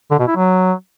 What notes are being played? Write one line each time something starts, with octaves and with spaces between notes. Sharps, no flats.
D3
B2
E4
F#3